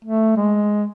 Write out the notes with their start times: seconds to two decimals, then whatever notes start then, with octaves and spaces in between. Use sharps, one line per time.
0.05 A3
0.37 G#3